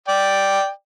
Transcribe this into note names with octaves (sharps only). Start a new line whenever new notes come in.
D5 G5